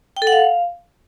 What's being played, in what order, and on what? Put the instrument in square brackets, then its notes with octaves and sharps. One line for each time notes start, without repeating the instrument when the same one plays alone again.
[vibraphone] G5
A4
F#5
F5